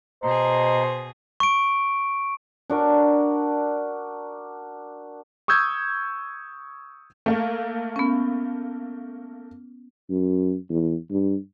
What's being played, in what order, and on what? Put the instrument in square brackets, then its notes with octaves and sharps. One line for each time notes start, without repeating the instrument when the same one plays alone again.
[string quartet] B2 G#4 [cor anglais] C5 [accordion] D#5 A#5
[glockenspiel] C#6 D7
[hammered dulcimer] D4 F#4 A#4
[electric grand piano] C#6 D#6 E6 G6 G#6
[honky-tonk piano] A3 A#3
[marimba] B3 C#4
[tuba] F#2
E2
G2